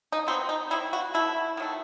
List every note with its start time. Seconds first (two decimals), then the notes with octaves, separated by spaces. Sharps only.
0.12 D#4
0.27 C3 F#3 B3 C4
0.49 D#4
0.70 C3 D#3 G3 E4
0.93 F#4
1.14 B2 A3 E4
1.57 D#3 F#3 A3